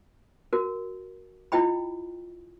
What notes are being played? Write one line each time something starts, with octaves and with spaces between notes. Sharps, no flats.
F#4 A#4
E4 F4 D#5 G5 B5